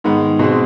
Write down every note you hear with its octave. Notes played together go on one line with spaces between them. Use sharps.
G#2 D#3 G#3 B3
B2 G#3 C4